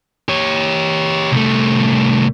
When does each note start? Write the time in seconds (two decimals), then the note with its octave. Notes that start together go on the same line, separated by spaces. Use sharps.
0.29 G4 C#5
1.32 C2 A3